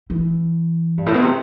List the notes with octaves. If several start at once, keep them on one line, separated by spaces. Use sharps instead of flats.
E3
G2
A2
B2
C3